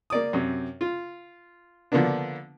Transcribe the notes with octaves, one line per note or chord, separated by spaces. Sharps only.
A#3 D5 D#6
F#2 C3
F4
D3 F3 A#3 B3 D4